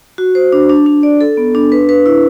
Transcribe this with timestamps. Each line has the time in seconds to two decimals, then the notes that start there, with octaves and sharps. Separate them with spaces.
0.18 F#4
0.35 C5
0.53 D4
0.69 D4
0.86 D4
1.03 D5
1.21 A4
1.37 B3
1.55 D4
1.72 B4
1.89 B4
2.06 E4